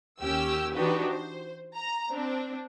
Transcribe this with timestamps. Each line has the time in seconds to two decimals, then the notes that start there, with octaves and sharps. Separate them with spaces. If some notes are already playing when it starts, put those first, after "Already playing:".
0.21 D#2 C#4 G4 E6
0.74 E3 D4 D#4 F#4 G4 B4
1.11 C5
1.77 A#5
2.10 C4 D4